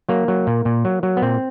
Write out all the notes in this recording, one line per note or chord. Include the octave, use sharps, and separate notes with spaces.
F#3 A#3
F#3
A#2
A#2
F#3
F#3
B3
A#2 C4